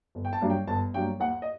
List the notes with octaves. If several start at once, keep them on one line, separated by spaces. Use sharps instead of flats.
G1
G5
A5
G2 F#3 A#3
G5
G1 A5
G2 F#3 A#3 G5
D#2 F#5
D#5